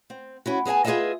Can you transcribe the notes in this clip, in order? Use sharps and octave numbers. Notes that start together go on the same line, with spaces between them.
C4
C#4 E4 F#4
B3 G#4 D#5 G#5 A5
F4 G#4 A4 B4 D#5 E5